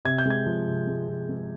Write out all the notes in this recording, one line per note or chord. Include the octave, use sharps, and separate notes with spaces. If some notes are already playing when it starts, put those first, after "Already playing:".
C3 G#6
G6
G#3 G#6
F3
C3
G#3
F3
G#3